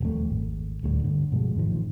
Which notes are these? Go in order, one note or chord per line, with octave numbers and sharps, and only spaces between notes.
D#1 F2 A3
G#1
D1 D2 F#3 G3
G2 D3
G2 B2 F3 G#3
A1 G#2 D#3 F3